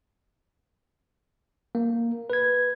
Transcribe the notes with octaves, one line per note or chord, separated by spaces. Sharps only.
A#3
B4 G#6